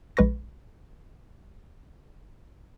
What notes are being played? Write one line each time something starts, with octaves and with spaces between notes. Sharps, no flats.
A#1 G#3 B4 C#6 A#6